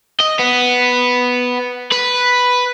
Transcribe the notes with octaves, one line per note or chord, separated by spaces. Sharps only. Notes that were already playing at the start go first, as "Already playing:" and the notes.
D#5
B3
B4